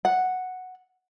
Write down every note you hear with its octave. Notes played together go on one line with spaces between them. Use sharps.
F#5